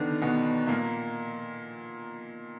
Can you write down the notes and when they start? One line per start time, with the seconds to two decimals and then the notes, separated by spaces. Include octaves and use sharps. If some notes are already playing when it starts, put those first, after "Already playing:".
Already playing: D3 D#3 B3 D4
0.22 B2 B3
0.67 A#2 A#3